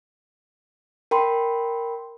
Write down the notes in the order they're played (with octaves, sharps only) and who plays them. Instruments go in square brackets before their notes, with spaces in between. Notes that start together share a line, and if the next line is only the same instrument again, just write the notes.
[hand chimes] A#4 G5 B5 C6